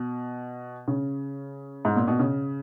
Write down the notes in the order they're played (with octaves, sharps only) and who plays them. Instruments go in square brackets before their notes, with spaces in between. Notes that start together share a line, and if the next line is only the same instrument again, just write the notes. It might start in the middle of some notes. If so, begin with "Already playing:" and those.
Already playing: [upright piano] B2
C#3
G#2
A#2
B2
C#3